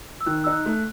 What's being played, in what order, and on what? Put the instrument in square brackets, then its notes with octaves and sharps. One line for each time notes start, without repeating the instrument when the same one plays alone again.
[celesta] E6
[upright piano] D#3 [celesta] F#6
[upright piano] D#4 [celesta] E6
[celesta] F#6
[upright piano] A3
[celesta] F#6